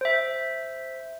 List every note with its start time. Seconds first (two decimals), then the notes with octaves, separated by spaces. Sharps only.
0.01 C5 E5